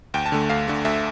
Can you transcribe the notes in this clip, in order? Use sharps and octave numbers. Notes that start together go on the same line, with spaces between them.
D2 G5
A5
D3 A3
D2 F5
D3 A3
D2 E5